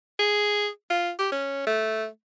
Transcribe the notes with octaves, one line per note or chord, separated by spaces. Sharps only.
G#4
F4
G4
C#4
A3